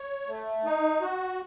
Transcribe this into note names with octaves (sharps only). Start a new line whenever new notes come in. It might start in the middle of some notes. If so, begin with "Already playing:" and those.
Already playing: C#5
A3
D#4
F#4